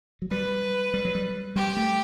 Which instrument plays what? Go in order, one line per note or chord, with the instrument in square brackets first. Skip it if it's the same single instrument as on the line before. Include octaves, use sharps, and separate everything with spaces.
[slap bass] F#3
[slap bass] G3 [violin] B4
[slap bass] G3
F#3
G3
[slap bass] G3 [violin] G4
[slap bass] A3